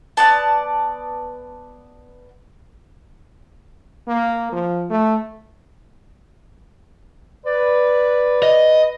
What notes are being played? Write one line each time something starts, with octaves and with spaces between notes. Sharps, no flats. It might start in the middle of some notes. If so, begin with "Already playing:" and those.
B3 D5 A5
A#3
F3
A3
B4 D5
D#5